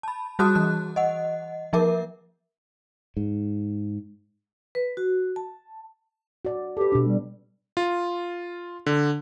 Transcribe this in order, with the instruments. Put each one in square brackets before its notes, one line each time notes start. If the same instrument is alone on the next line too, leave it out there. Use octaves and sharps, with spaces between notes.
[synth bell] A5 B5
G3 F#4 G#4 A5 D#6 F#6
E3 F#6
D#5 F#5
F3 A#3 A#4 E5 D6
[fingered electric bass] G#2
[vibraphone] B4
F#4
A5
[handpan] F#4 D5
[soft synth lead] G4 [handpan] A4 B4
[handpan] B2 D4
[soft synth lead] G3
[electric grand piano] F4
D3